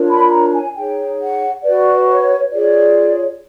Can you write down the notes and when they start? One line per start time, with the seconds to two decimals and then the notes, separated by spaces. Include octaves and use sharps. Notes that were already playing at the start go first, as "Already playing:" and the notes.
Already playing: D4 F4 A#4 C#5
0.09 B5
0.31 A#5
0.53 G#5
0.75 D#4 G#4 C#5 G5
1.19 F#5
1.64 F#4 B4 D5
2.08 C#5
2.52 F4 G#4 C#5 D5